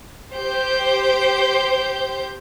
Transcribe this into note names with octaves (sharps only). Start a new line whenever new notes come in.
G4 C5 G6